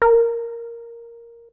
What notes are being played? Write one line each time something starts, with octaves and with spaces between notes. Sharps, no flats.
A#4